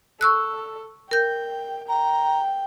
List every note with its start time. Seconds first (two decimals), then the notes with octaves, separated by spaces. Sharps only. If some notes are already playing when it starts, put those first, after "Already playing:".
0.21 A4 C#6 E6 F#6
1.11 A#4 G5 G6
1.89 G5 A#5